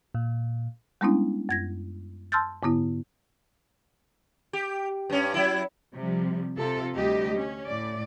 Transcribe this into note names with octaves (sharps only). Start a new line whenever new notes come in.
A#2
G3 G#3 B3 C#4 D4 E4
F#2 G#6 A#6
A5 C6 E6 F6 G6 A6
G#2 D3 B3 E4
G4
G2 C#4
F#3 E4
C3 F3 G3
C3 F4 A4
D2 G3 G4 D#5
C#4
A2 D5